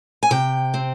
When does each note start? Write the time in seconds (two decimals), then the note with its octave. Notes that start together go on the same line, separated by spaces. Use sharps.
0.23 G#5
0.31 C3 G5
0.74 C4